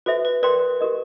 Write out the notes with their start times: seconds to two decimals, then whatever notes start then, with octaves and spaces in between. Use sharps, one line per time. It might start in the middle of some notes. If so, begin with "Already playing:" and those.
0.06 F#4 A4 B4 C5 E5
0.25 B4
0.42 A#4 B4 D5 G5 C6
0.80 G4 A#4 D#5